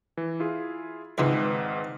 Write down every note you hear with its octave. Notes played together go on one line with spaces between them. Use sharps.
E3
E4 F4 G#4
G#1 C#2 G#2 E3 G#3 B4